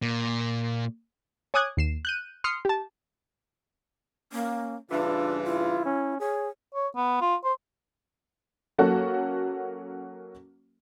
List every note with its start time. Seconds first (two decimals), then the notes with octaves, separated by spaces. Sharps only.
0.02 A#2
1.54 C#5 G#5 D6 D#6 F#6 G#6
1.77 D#2 C7 E7
2.05 F#6 G6 D#7
2.44 C6 D#6 F6 C7 C#7
2.65 G4 A5
4.33 A#3 C#4
4.90 G2 C#3 E3 D4 F4
5.45 E4 F4
5.86 C#4
6.20 G#4 C#5
6.75 C#5
6.96 B3
7.21 F4
7.44 C5
8.78 F#3 A#3 C#4 F#4 A4 F#5